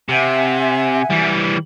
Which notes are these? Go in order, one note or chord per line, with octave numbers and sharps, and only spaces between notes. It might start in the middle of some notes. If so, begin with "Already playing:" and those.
C3 E5 F#5 G#5
E3 G3